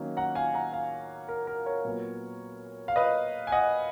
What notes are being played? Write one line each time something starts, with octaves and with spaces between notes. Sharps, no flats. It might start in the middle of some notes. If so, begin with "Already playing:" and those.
Already playing: D#3 F#3 A#3 C#4
F#5 A#5
F5 G#5
F#5 A#5
F5 G#5
A#4
A#4
A#4 C#5
A#2 F#3 B3
F5
B4 D#5
G#5
D#5 F#5